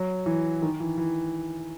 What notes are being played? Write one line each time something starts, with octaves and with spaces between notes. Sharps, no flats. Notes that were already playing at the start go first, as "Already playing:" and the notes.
Already playing: F#3
E3
D#3
E3
E3